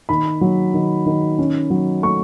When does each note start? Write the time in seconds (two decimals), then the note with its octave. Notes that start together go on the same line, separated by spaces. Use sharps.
0.09 D#3 B5
0.41 F#3
0.74 D#3
1.06 D#3
1.39 C#4
1.70 F#3
2.03 A3 C#6